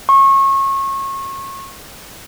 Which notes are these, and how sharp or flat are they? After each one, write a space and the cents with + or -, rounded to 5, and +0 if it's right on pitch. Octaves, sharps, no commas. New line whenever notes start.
C#6 -30